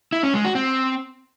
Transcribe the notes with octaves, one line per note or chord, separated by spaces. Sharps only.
E4
C#4
G#3
F#4
C4